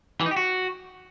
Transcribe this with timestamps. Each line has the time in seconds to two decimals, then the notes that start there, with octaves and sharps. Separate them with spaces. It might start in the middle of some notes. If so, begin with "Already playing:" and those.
0.21 E3
0.26 D#4
0.31 G4
0.36 F#4